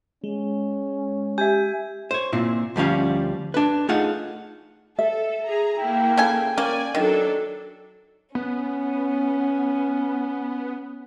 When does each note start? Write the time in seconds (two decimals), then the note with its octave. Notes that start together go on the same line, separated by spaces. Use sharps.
0.24 G#3 C#4
1.38 G4 E5 G#5
2.11 C5 C#5
2.33 A#2 C4 E4
2.76 D2 F3 G3 C#4 F5
3.54 D4 B4
3.89 A3 D#4 F4 G#4 F#5
4.99 A4 E5
5.46 G#4 A#5
5.79 A#3 E4 G5
6.17 C#3 A4 G#5
6.58 A#3 C#4 D5 G#5
6.95 D#3 F#3 D4 A4
8.35 B3 C#4